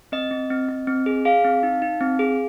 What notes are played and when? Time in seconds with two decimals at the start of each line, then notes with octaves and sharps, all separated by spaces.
0.12 C4 D#5
0.31 C4
0.50 C4
0.69 C4
0.87 C4
1.06 G#4
1.25 G#4 F5
1.44 C4
1.63 D#4
1.82 D#4
2.01 C4
2.19 G#4